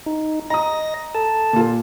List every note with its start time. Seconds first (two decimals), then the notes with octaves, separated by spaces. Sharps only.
0.06 D#4
0.50 D#5 A#5 D#6 A#6
1.15 A4 A5
1.53 A#2 F4